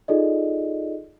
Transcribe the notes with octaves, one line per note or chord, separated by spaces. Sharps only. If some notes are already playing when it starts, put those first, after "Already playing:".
D#4 F4 G#4 A4 D5 D#5